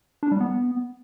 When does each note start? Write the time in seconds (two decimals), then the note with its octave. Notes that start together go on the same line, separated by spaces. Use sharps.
0.23 D4
0.32 G3
0.40 B3